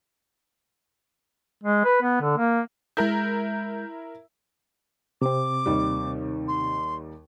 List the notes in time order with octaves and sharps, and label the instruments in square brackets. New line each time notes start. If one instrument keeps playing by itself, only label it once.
[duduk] G#3
B4
B3
D3
A#3
[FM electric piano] G#3 G6 [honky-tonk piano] E4 A#4
[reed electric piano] C3 C4 [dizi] D6
[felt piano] D#2 D#3 G3
[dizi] C6